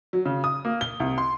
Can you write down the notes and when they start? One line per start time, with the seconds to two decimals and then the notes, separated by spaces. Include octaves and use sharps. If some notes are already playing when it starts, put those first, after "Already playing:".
0.13 F#3
0.26 C#3
0.44 D#6
0.65 A#3
0.81 G7
1.00 C2
1.18 C6